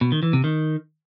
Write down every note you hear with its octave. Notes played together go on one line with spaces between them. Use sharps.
B2
D#3
E3
C3
D#3